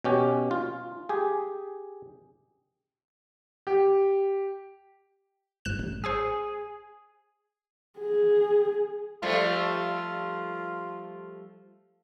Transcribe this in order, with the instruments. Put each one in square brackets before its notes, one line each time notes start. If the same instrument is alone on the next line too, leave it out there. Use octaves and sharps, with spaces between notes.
[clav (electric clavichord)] B2 C#4 G4
F4
G4 G#4
[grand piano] G4
[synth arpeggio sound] G1 F#6 E7
A1
[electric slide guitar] G#4 [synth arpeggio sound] C5 G#5 E6
[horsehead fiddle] G#4
[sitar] F3 G3 A3 [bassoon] F4